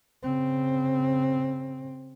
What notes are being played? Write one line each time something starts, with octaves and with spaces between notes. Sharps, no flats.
C#3 C4